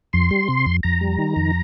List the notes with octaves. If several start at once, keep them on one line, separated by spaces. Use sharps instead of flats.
F2 C6
G3
C3
F2
F2 A#5
G3
D#3
F2